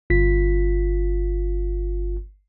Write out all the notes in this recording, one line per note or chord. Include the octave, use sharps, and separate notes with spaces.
G1 F4 B6